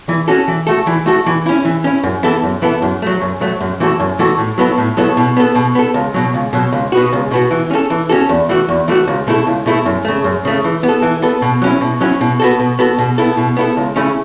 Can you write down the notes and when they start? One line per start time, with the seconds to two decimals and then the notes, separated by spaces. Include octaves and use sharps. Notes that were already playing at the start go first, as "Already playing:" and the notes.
0.09 E3
0.28 C#4 F#4 A4
0.48 E3
0.67 A3 F#4 A4
0.87 E3
1.06 A3 F#4 A4
1.26 E3
1.46 C#4 E4
1.65 E3
1.84 C#4 E4
2.03 F#2
2.23 E3 B3 E4 A4
2.44 F#2
2.62 E3 B3 E4 A4
2.82 F#2
3.02 F#3 A3
3.21 F#2
3.41 F#3 A3
3.61 F#2
3.80 E3 A3 F#4 A4
4.00 F#2
4.19 E3 A3 F#4 A4
4.38 A2
4.58 F#3 B3 E4 A4
4.78 A2
4.97 F#3 B3 E4 A4
5.17 B2
5.37 B3 A4
5.55 B2
5.75 B3 A4
5.94 C#2
6.14 B2 F#3
6.34 C#2
6.53 B2 F#3
6.73 C#2
6.92 B2 B3 F#4
7.13 C#2
7.31 B2 B3 F#4
7.51 E3
7.71 C#4 F#4 A4
7.90 E3
8.09 C#4 F#4 A4
8.29 E2
8.49 E3 A3 F#4
8.69 E2
8.88 E3 A3 F#4
9.08 C#2
9.27 B2 A3 E4 A4
9.47 C#2
9.66 B2 A3 E4 A4
9.86 F#2
10.05 C#3 A3
10.24 F#2
10.45 C#3 A3
10.64 E3
10.83 B3
10.88 A4
11.02 E3
11.22 B3 A4
11.42 B2
11.62 F#3 C#4 E4
11.81 B2
12.01 F#3 C#4 E4
12.21 B2
12.40 B3 F#4 A4
12.60 B2
12.79 B3 F#4 A4
12.99 B2
13.18 B3 E4 A4
13.37 B2
13.57 B3 E4 A4
13.77 C#2
13.96 C#3 A3 C#4 E4